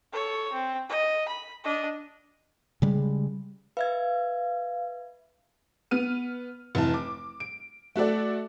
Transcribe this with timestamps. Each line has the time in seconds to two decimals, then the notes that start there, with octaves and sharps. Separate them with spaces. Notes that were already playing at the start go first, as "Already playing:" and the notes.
0.13 A4 C#5
0.52 C4
0.89 D#5
1.28 B5
1.64 D4 D#5
2.82 C#3 G3 G#3
3.77 B4 E5 F5 G#6
5.91 B3 F6 D#7
6.75 F1 E3 E4 A5
6.94 D6
7.40 D7
7.96 A3 F#4 A4 D5